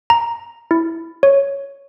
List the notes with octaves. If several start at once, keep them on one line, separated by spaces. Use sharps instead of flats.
A#5
E4
C#5